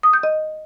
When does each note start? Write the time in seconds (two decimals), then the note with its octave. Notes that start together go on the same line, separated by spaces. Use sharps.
0.03 D#6
0.13 G6
0.23 D#5